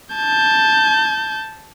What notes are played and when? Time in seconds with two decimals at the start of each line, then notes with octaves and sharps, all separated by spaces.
0.15 A5 G6